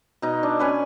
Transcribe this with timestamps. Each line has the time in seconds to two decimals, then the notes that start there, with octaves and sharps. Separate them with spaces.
0.22 B2 D#4
0.43 D4
0.59 C#4 B4 G#5